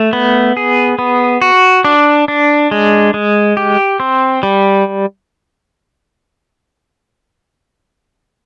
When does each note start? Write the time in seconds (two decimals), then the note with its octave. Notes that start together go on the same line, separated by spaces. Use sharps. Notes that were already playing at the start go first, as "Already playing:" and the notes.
Already playing: A3
0.13 B3
0.57 G#4
0.99 B3
1.42 F#4
1.85 D4
2.28 D4
2.71 G#3
3.14 G#3
3.57 G4
4.00 C4
4.43 G3